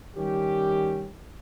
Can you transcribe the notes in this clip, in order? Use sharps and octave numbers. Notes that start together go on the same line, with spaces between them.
D#3 G3 C#4 G4